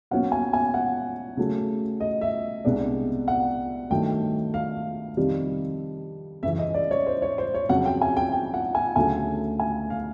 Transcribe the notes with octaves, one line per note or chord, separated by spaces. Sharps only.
B2 F#3 A#3 C#4 F#5
G#5
G#5
F#5
C#3 F#3 A3
D#5
E5
C2 B2 G#3 B3 D4
F#5
G2 D#3 F#3 A3 G5
F5
F2 C3 D#3 G3
F#2 C#3 E3 E5
D#5
D5
C#5
C5
C#5
C5
C#5
F2 C#3 F#3 F#5
G5
G#5
G5
G5
F#5
G#5
D2 C#3 F#3 A3 G#5
G#5
F5